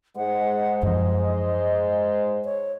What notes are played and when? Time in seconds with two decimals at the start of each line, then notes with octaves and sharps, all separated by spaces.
0.16 G#2 G#3 C5 F#5
0.83 F#2 F3 D#5
2.45 C#5